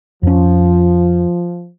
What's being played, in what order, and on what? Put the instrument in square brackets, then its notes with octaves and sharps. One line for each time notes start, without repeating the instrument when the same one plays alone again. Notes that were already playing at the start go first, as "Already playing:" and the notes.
[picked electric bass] F2 C#4 [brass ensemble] F3